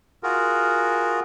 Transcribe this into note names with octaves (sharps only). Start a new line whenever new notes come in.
F4 F#4 G#4 A#4